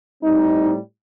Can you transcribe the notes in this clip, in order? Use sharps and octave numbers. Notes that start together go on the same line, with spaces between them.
A2 G3 C4 D#4